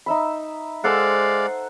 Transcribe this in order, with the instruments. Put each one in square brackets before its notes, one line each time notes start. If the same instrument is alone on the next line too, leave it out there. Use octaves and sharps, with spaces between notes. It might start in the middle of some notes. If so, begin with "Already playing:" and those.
[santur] D#4 E5 B5
[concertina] G#3 D5 F5 [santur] A4 C5 F#5